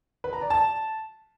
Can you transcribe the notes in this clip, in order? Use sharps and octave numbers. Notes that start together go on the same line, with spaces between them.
B4
A#5
D5
A5